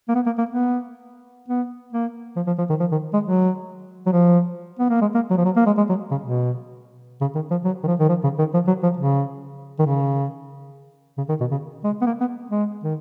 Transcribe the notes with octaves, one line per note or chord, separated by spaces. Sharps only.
A#3
B3
A#3
A#3
B3
B3
A#3
F3
F3
F3
D#3
F3
D#3
G#3
F#3
F#3
F3
B3
A#3
G#3
A#3
F#3
F3
F#3
A#3
G#3
G#3
F#3
C#3
B2
C#3
D#3
F3
F#3
D#3
F3
D#3
F3
C#3
D#3
F3
F#3
F3
C#3
D#3
C#3
C#3
D#3
B2
C#3
G#3
B3
A#3
B3
G#3
D#3